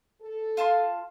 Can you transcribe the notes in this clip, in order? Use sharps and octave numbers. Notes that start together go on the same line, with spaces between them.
A4
F4 A5 C6